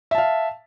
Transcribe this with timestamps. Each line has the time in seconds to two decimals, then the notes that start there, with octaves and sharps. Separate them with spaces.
0.11 E5
0.15 A5
0.18 F5